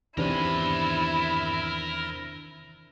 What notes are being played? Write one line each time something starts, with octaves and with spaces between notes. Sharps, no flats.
E2 C3 D#3 D4 E4 A#4 C5 G#5